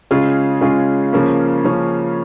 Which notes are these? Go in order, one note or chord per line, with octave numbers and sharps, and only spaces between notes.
C#3 G#3 C#4 F4 G#4
C#3 G#3 C#4 F4 G#4
C#3 F3 A#3 C#4
C#3 F3 A#3 C#4